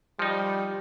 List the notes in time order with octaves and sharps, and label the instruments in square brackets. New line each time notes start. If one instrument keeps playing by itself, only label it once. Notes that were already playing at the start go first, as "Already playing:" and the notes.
[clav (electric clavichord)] F3 D#4 [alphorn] G3